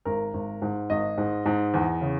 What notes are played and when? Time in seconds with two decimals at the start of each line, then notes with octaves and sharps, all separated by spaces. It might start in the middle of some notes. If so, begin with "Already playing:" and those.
0.05 G#1 A#4
0.34 G#1
0.62 G#2
0.90 G#1 D#5
1.18 G#2
1.46 G#2
1.74 E2
2.01 C#3